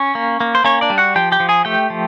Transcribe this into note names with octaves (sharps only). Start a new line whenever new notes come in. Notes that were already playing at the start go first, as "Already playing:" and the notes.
Already playing: C#4 C#5
A#3
A#3
C5
A#3 C#4 C#5
D4 D5
G3
F#4 F#5
F3 G4 G5
G4 G5
F3
G#4 G#5
A3 G4 G5
F3